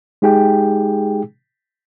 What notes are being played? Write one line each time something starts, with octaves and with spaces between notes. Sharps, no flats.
G#3 D#4 G4 G#4 G5